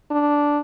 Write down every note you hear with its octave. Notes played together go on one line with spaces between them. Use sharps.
D4